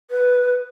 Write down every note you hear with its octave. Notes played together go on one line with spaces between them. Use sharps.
B4